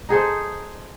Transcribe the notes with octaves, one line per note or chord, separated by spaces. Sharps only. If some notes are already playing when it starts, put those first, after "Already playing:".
D#4 G#4 A4 C5